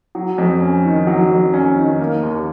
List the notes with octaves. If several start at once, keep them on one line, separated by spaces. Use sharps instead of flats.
F#3
F2
C#4
D#3
F#3
F2
C#4
D#3
A#3
D#2